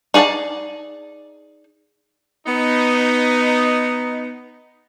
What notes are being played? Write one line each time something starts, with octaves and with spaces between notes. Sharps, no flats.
D#4 G#4 D5 F5 A5
B3 D#4